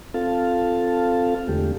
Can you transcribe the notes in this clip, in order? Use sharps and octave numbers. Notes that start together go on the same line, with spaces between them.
C4 F4 A4 F5 A5
E2 D3 G#3 A3 G4